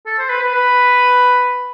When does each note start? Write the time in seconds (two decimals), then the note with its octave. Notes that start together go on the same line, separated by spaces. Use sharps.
0.06 A4
0.19 C5
0.30 B4
0.42 B4
0.55 B4